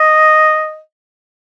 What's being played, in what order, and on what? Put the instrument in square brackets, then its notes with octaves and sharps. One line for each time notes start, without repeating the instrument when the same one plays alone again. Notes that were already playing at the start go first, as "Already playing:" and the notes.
Already playing: [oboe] D#5